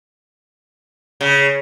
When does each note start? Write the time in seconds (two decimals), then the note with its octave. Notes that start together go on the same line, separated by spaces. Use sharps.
1.21 C#3